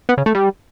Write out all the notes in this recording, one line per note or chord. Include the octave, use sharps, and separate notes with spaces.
B3
C#3
A3
G3